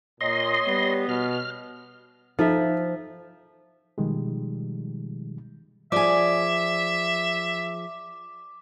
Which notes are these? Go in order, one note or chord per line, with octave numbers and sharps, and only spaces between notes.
A#2 C#5 D#5 C6
G3 B3
B2 F6
F3 D#4 A4 E5
B2 D#3 F3 G3 G#3
F3 G#4 D5 E5 G#5 D6